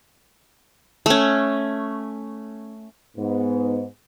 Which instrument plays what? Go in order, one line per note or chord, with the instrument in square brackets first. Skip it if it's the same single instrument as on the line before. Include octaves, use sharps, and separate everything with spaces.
[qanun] A3 C#4
[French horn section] G#2 B3